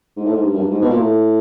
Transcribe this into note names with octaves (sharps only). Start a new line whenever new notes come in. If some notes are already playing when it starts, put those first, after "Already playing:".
G#2
A2
G#2
G2
F#2
G2
G#2
B2
A#2
A2